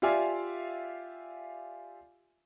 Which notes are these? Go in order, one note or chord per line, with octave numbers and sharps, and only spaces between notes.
F4 G4 D5 E5 F5 G#5